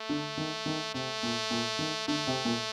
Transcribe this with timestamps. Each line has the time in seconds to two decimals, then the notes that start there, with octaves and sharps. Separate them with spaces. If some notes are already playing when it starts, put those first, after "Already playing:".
Already playing: A3
0.09 D3
0.37 D#3
0.66 D#3
0.94 C3 A3
1.23 A#2
1.51 A#2
1.79 D#3
2.08 D3 A3
2.27 C3
2.45 A#2